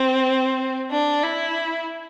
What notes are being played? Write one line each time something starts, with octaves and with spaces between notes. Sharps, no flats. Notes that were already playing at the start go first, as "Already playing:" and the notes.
Already playing: C4
D4
E4